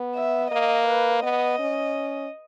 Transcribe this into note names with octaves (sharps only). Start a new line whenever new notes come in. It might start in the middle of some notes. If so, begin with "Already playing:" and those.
Already playing: B3
E5
A#3 D#5
B4
B3 D#5
C#4